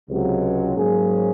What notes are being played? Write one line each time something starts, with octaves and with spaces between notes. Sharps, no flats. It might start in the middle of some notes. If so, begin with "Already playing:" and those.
C#2 C3 F#3
G#2 F#3 A#3 C#4 G#4